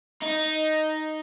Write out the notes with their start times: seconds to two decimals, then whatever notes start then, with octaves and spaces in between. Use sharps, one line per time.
0.22 D#4